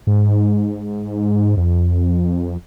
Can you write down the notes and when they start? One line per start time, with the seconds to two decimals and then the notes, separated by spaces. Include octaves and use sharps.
0.07 G#2
1.57 F2